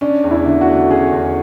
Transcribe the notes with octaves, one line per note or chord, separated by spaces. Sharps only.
C#4 D4
E2
E4
D3
F#4
A3
C#4 G#4
E2